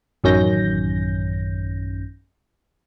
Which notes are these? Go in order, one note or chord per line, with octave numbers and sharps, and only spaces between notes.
A1 F#2 D#3 C#4 G6 A#6